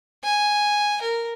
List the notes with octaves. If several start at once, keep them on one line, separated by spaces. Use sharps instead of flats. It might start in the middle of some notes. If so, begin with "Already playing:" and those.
G#5
A#4